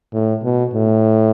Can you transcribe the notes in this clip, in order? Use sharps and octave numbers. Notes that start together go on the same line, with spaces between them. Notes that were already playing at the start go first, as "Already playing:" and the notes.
A2
B2
A2